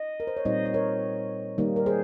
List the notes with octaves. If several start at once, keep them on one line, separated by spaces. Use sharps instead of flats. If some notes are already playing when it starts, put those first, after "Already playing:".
Already playing: D#5
A#4
C5
C#5
A#2 G3 C4 D#4 C5 D#5
D#5
A#4 C#5
D#3 G3 A#3 D#4
A#4
G#4 C5